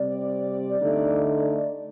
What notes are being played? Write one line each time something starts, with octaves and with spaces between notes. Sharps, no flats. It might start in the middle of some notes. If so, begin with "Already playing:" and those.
Already playing: C3 G3 C4 D5
D3 A3 D#4